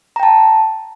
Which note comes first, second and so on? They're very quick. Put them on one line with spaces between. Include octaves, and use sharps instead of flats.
A#5 G5 A5